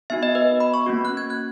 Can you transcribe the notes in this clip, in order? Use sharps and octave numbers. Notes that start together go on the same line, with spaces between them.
B3 D#4 F#4 E5
D#5
B4
B5
C#6
A#3 C#4 F#4
F#6
G#6
F#6